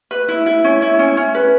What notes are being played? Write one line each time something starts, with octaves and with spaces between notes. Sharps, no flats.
B4
E4
E4
C#4
E4
C#4
C#4
B4